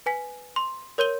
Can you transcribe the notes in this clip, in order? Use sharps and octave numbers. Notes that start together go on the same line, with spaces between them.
B4 G#5 B6
C6
A#4 C#5 C6 G6 D#7 G7